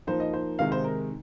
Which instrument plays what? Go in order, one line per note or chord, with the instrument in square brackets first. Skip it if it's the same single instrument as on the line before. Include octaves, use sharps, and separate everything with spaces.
[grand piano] F3 A#3 D#4 [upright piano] C5
[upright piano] D#5
C5
[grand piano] C3 D#3 G#3 D#4 [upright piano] F5
[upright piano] C5
A#4